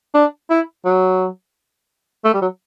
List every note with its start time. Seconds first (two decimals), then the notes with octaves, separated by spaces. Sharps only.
0.14 D4
0.50 E4
0.85 F#3
2.25 A3
2.34 G3
2.42 F#3